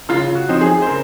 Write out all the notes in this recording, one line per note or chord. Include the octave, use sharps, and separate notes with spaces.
C#3 F4
F#4
F3 C4 D#4
G#4
C5
C#3 A#4